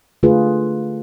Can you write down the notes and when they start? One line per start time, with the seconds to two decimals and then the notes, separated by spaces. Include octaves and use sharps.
0.23 D3 A3 F4 G#4 B4